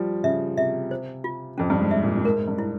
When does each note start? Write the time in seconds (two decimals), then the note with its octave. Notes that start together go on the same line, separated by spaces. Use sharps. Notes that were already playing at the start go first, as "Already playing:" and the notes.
Already playing: F3 G3
0.24 C#3 E5
0.57 C3 E5
0.91 C5
1.24 F4
1.58 F2 C#4
1.70 G2
1.80 G#2
1.91 G#2 E5
2.02 A#2
2.17 A#2
2.25 G#2 A#4
2.48 G2
2.59 E4